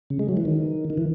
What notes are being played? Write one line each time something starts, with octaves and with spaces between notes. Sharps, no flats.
C#3
G#3
F#3
E3
D#3
D#3
E3